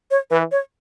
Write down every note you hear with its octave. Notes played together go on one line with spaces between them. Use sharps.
C#5
E3 B4
C#5